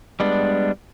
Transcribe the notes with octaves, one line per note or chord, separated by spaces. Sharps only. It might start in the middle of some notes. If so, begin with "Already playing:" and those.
G3 G#3 B3 D4